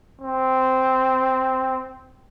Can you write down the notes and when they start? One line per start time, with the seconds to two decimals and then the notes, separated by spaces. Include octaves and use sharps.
0.21 C4